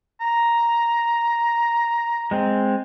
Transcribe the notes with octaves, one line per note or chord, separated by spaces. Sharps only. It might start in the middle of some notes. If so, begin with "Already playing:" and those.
A#5
G#3 C4